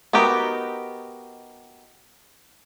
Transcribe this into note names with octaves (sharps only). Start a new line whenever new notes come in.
B3 D#4 F#4 G4 A#4